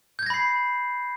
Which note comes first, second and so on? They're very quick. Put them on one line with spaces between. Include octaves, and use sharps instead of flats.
G6 G#6 A#6 B5 C7